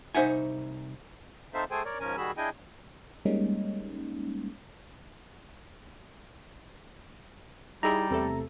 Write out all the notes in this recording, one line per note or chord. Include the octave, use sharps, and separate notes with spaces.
C2 D#4 C5 E5 F#5 G#5
C4 D#4 A4 C5 E5 F5
A3 G#4 A4 C5 G5 G#5
A#4 C#5 D5
G#2 F3 C#4 A#4 G#5
D#3 G3 F#4 G#4 B5 E6
D4 E4 G#4 D#5 G5 G#5
G3 G#3 A#3 C#4 D#4
G3 D#4 E4 G#4 A#5
E2 C3 A3 A4